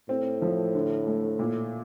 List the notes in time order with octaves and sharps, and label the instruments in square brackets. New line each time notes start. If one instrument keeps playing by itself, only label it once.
[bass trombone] A2 [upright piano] C4
[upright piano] F3
D3
A3
A#2